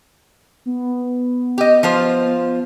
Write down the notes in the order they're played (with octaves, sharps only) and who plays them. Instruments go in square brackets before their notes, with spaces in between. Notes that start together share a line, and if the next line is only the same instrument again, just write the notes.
[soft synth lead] B3
[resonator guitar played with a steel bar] G4 D#5
F3 F4 C5